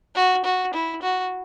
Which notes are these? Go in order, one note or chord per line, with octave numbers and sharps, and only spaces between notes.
F#4
F#4
E4
F#4